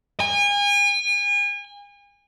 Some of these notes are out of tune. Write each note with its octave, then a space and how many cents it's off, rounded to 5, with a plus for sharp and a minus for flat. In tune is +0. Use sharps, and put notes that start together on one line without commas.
G#5 -35